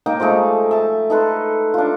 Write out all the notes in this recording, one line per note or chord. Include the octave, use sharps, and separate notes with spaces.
A#3 D#4 G5
F3 G#3 A3 D#4
E5 A5
D#4 A4 B4 C6
D4 F4